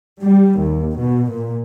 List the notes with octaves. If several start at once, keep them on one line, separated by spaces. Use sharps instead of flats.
G3
D#2
B2
A#2